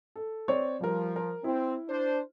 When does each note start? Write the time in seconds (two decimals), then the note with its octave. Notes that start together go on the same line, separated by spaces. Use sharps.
0.16 A4
0.48 C4 C#5 D5
0.81 F3 G3 A#4
1.16 A#4
1.44 C4 E4
1.88 D4 C5